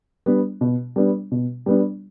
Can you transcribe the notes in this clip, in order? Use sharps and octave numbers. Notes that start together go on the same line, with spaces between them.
G3 B3 D4
B2
G3 B3 D4
B2
G3 B3 D4